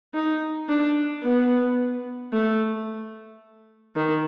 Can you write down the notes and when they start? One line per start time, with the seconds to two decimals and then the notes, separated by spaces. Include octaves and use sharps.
0.14 D#4
0.69 D4
1.24 B3
2.33 A3
3.96 D#3